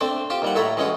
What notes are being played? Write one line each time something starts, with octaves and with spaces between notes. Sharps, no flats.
A3 C4 D4 C5
F4 G4 C5
D#2 G3 F#5
A2 A4 C#5 E5 A#5
E3 G#3 C#4 F#4